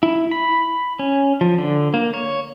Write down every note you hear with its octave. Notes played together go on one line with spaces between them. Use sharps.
E4
B5
C#4
F3
D3
A#3
C#5